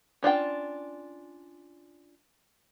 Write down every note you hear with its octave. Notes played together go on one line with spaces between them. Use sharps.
C#4 D4 F4 G5